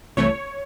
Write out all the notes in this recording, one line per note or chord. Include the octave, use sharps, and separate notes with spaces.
C2 C3 E3 A3 C#5